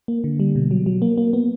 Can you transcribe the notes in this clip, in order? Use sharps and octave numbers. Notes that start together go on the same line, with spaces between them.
A#3
D3
G3
B2
F#3
F#3
A#3
A#3
B3